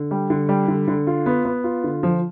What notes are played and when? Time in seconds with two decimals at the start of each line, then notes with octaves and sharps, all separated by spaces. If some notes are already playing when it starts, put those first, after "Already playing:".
Already playing: D3
0.11 G3
0.30 D3
0.49 G3
0.68 D3
0.88 D3
1.07 F4
1.26 B3
1.45 B3
1.64 F4
1.84 D3
2.03 F3